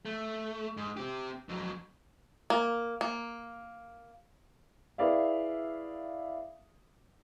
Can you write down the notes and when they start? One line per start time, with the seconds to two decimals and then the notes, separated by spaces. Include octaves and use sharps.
0.05 A3
0.77 G#2
0.97 C4 G4
1.49 F2 F#3
2.50 A#3
3.01 A#3
4.98 E4 G#4 B4 D5 E5 F5